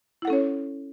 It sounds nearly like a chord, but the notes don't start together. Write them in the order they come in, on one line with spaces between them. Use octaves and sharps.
E4 F#5 A4 C#4 C#5